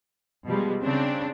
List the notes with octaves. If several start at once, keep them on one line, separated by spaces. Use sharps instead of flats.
B2 F3 G3 G#3
C#3 C4 D4